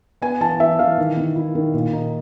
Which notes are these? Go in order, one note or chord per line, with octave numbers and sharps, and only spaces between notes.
B3 G#5
E3 A5
E3 E5
E3 F5
D#3
D#3
E4
D#3
A#2
D#4